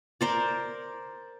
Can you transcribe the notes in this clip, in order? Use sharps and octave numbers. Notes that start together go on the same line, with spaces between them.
A#4 C5 D5